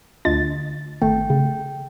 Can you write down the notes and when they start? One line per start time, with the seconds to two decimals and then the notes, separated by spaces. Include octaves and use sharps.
0.25 D2 D4 F4 D#5 A6
1.02 G#1 A3 G5
1.30 C#3